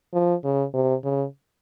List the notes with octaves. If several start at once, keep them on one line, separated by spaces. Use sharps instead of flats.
F3
C#3
C3
C#3